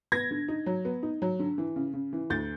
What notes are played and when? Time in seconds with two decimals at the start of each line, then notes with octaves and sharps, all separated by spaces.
0.12 B3 G#6 A#6
0.31 D3
0.48 D#4
0.66 F#3
0.85 B3
1.03 D#4
1.22 F#3
1.39 D3
1.58 E3
1.76 C#3
1.94 C#3
2.13 E3
2.30 D2 G6 A6